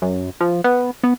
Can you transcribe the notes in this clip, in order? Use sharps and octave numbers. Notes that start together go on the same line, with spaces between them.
F#2
F3
B3
B3